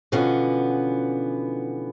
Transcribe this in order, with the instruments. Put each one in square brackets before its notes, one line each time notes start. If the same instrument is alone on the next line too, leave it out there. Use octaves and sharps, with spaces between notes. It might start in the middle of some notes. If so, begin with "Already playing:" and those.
[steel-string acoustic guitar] B2 D3 E3 F3 B3 C#4